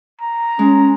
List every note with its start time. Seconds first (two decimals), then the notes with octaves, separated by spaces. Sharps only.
0.21 A#5
0.59 G#3 C#4